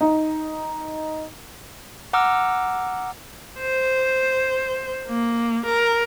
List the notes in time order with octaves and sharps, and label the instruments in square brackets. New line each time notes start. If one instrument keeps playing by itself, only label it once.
[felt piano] D#4
[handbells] F#5 A#5 D6 E6 F6
[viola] C5
A#3
A#4